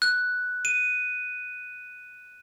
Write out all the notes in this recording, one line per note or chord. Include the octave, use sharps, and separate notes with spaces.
F#6
D#7